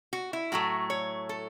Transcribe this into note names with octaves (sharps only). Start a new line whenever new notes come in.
F#4
E4
A2 F#3 A3 F#4
C#5
A4